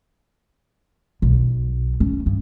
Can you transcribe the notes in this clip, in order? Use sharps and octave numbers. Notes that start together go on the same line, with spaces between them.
B1
C#4
G2